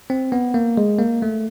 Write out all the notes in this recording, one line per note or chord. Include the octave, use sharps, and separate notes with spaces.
C4
B3
A#3
G#3
A#3
A3